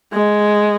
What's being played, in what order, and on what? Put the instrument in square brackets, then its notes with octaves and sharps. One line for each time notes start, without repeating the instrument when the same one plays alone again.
[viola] G#3